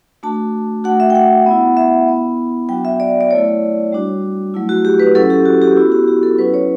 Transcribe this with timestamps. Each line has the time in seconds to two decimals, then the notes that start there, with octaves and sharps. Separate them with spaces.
0.23 A3 D4 F#4 A5
0.84 A3 D4 F#4 F#5
1.00 E5
1.10 G5
1.15 F#5
1.46 B3 E4
1.77 E5
2.08 B3 E4
2.69 F#3 B3 D4 F#4 G5
2.85 E5
3.00 D5
3.21 D5
3.31 F#3 A3 E4 C#5
3.92 G3 D4 F#4
4.54 F#3 A3 E4
4.69 F#4
4.85 G4
5.00 B4
5.15 F#3 C#4 E4 A4
5.30 G4
5.46 F#4
5.62 G4
5.77 B3 E4 F#4
5.92 G4
6.08 G4
6.23 A4
6.38 F#3 C#4 E4 B4
6.54 C#5